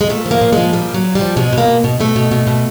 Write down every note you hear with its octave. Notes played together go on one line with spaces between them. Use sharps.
G#3
A#2 A3
F3
A#3
A#2
G#3
F3
A#2 G3
F3
F#3
A#2
G3
F3
B2 G#3
B2
A#3
B2
B2
B2 A3
B2
B2
B2